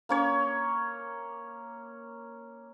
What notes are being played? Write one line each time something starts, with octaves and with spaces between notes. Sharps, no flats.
A#3 C#4 C#5